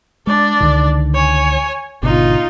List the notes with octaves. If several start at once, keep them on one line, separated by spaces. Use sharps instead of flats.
G#3 D4 D5
C#2 D3 D#3
C#5 G#5
G#1 B2 D3 D#4 F4